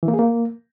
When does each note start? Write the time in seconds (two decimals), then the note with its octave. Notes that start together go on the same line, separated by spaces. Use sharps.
0.03 E3
0.08 A#3
0.14 G#4
0.19 A#3